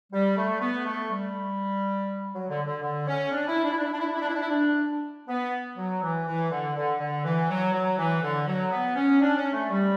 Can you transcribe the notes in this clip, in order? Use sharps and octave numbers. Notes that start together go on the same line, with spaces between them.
G3
A3
B3
A3
G3
F#3
D3
D3
D3
C#4
D4
E4
D4
E4
D4
E4
D4
E4
D4
E4
D4
E4
D4
E4
D4
B3
F#3
E3
E3
D3
D3
D3
E3
F#3
F#3
E3
D3
F#3
B3
C#4
D4
C#4
A3
G3